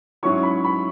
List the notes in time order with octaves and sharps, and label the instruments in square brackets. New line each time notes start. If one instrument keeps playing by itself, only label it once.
[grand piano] G#2 F#3 C#4 E4 [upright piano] C#6
[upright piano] B5
B5